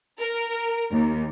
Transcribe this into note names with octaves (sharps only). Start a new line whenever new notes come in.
A#4
D#2